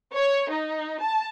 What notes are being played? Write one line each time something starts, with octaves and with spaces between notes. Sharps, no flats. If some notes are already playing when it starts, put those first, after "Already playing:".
C#5
D#4
A5